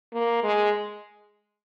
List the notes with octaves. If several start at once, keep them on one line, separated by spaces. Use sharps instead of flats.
A#3
G#3